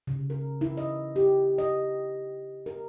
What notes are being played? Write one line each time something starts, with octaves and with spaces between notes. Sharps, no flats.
C#3
A#4
E4
D#5
G4
D#5
A#4